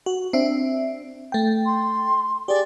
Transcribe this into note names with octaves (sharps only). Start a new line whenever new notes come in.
F#4
C4 D4 E5
A3 G5
C6
G4 G#4 D5